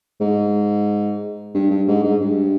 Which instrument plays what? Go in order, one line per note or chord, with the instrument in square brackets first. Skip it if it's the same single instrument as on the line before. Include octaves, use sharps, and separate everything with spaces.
[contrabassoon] G#2
G2
G2
G#2
G#2
G2